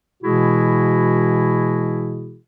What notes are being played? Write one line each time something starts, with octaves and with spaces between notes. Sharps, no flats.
B2 E3 G#3 E4 F#4 G#4